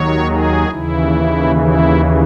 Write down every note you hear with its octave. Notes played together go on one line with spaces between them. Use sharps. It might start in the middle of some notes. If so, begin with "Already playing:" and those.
Already playing: D#2 D#3 F#3 C#5
G#4
D#2 C#3 E3 E4
E4